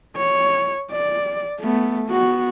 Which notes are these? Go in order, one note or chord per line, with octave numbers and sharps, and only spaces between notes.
C#5
D5
A3 B3
B3 F#4